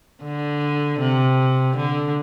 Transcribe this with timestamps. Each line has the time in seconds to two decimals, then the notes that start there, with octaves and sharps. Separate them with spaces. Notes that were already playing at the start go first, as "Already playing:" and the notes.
0.23 D3
1.00 C3
1.76 D3